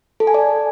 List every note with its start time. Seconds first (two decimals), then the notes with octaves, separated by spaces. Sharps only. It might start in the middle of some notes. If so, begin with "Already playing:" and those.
0.20 A4
0.27 G#5
0.34 D5